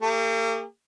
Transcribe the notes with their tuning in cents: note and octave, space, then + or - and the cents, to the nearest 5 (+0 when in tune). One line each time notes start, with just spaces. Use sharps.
A#3 -45 G4 +40